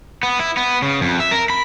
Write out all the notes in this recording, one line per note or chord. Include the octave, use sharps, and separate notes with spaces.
B3
E4
B3
C#3
F2
E5
A#4
B5